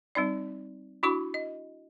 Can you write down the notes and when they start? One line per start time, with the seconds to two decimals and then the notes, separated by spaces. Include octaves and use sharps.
0.15 G3 C4 D#4 D5
1.03 D4 E4 F#4 B5 D6
1.34 D#5